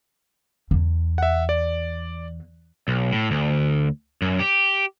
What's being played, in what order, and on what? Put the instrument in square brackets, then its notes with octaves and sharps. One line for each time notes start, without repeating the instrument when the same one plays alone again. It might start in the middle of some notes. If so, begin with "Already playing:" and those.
[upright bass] E2
[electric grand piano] E5 F#5
D5
[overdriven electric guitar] B1
A2
D2
F#2
G4